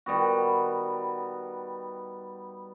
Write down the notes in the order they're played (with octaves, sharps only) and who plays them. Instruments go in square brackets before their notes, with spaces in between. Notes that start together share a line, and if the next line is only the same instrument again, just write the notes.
[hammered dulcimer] D#3 G3 B3 F#4